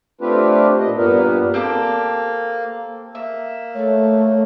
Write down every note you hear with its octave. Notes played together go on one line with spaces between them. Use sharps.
A3 C4 D4 F4 G4 B4
A#2 D#5
G2 A#2 A#3 B3 A#4 B4
A#3 C4 G4 A4
A#3 E5
A3 C#5